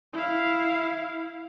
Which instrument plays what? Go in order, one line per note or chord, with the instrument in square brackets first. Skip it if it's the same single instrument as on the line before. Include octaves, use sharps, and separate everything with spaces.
[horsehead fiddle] E4 F5